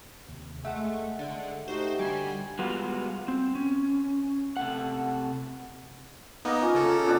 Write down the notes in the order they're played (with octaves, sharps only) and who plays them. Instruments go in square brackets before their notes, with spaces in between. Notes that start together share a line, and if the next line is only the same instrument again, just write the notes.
[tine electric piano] D#2 C3
[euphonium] G#3 [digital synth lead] A3 [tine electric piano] E5 F#5
[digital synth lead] D3 [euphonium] G#3
[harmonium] A3 D#4 F#4 [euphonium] G4 [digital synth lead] C5
[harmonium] D3 G#5 [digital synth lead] G3
[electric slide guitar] G3 G#3 B3 F4 F#4
C4
C#4
C3 A3 F#5
[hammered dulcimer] A#3 D#5 [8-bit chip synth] B3 D#4
[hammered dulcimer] C#4 [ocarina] F4
[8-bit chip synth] C#3 A4
[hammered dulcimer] B2 B3 D4 [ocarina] F4